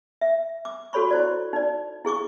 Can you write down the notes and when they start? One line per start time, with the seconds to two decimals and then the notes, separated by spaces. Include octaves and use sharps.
0.21 E5
0.65 D6
0.93 F#4 A4 C#5 B5 C#6
1.11 E4 C5 D5
1.53 D#4 D5
2.05 E4 G#4 C#6 D6